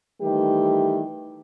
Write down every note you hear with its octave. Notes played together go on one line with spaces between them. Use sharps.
D#3 E3 G3 A3 G4